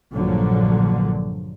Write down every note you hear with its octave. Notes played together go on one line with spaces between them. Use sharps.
A#1 G2 A#2 D3 F3 F#3